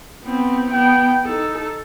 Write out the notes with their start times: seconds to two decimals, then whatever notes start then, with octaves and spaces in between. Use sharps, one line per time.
0.23 B3 C4
0.71 B3 G5
1.25 D#4 A4